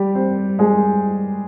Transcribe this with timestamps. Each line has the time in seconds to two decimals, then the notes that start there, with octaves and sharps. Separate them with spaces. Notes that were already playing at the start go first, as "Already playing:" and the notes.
Already playing: G3 G4
0.15 C4 C5
0.59 G#3 G#4